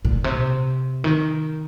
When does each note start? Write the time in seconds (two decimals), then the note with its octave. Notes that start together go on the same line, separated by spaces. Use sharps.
0.05 A#2
0.24 C3
1.04 D#3